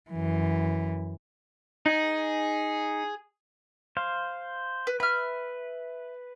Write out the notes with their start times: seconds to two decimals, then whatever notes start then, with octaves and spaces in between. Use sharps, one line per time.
0.11 F#2 E3
1.86 D#4 G#4
3.97 C5 F5
4.87 B4
5.00 B4 E5 F6